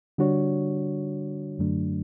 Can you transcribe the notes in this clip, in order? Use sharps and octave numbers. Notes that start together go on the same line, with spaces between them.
D3 G3 D4 F#4 C#5
F#2 D3 F#3 A3 D4